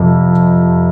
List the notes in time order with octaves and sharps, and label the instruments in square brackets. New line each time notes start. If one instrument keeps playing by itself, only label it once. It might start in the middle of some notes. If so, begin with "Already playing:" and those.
Already playing: [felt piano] F2 C3